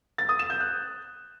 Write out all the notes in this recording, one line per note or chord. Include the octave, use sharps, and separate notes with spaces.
A6
D#6
E7
G6
F#6